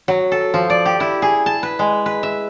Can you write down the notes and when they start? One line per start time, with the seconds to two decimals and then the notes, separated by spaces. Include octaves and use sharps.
0.08 F#3
0.32 A4
0.54 F3
0.70 D5
0.86 G4
1.00 E4
1.22 G#4
1.46 A5
1.63 B4
1.79 G#3
2.06 B4
2.23 E5